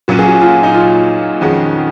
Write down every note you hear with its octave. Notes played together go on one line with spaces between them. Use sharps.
A#2 F#3 C#4 F#4
G#4
F#4
F4
D#4
F4
F2 D#3 G#3 C#4 F#4